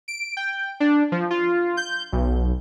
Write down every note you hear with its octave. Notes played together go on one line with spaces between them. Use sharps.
D7
G5
D4
F3
F4
G6
B1